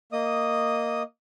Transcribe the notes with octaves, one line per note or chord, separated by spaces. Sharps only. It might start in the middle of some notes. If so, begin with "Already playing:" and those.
A#3 D#5 D#6